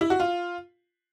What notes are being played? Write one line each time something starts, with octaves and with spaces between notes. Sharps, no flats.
E4
F#4
F4